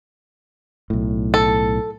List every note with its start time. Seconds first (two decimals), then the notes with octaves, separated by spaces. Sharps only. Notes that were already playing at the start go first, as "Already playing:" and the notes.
0.90 B1 A2
1.34 A4